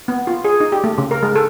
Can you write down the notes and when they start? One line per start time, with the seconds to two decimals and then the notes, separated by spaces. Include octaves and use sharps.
0.08 B3
0.27 F4
0.45 G#4
0.60 D#4
0.72 G4
0.84 A3
0.98 C#3
1.11 A#4
1.23 G#3
1.36 A4